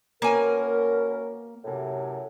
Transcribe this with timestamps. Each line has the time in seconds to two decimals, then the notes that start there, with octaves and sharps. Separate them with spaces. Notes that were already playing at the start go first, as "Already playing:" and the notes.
0.22 B2 A#3 C#4 A#4 G#5
1.65 F#2 A2 C3